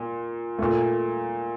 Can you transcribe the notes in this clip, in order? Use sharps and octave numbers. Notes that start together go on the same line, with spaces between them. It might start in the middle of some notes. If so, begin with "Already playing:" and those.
Already playing: A#2
A#2 A3